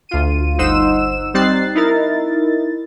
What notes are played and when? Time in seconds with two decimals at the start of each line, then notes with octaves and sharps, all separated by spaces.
0.09 D2 F4 D#7
0.58 G1 D#4 C5 F#5 E6 E7
1.34 G3 C4 D#4 F#6 A6 C7
1.75 D#4 E4 A#4 A6